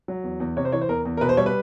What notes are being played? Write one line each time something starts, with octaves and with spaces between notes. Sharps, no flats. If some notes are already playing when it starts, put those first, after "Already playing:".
F#3
E2
E2
C3 C#5
C5
E3 C#5
C5
E2 A#4
E2
A#4
B2 B4
C5
G3 C#5
B4